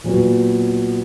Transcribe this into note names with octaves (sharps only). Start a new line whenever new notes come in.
A#2 F#3 B3